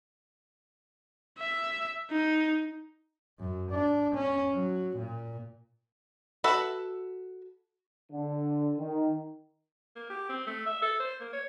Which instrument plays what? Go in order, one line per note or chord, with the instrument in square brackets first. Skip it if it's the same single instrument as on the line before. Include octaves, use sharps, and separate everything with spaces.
[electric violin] E5
D#4
[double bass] F#2
D4
C#4
F#3
A#2
[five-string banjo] F#4 A4 B4 E5
[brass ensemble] D3
D#3
[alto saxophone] A#3
G4
C4
A3
E5
A4
C5
A#3
C#5